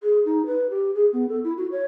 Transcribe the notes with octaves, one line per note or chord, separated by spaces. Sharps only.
G#4
D#4
B4
G4
G#4
B3
A4
E4
F#4
C#5